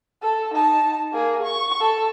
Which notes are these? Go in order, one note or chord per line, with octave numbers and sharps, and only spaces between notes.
A4
D#4 A5
A#3 G#4
C#6
A4